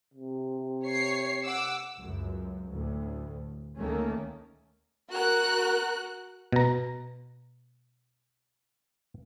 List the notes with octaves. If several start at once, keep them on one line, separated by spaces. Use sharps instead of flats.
C3
C#5 C7 C#7
F#5 D6 E6
C#2 F#2
D2 A2
D2 D#3 A3 A#3 C#4
F#4 A#4 F#6
B2 A#5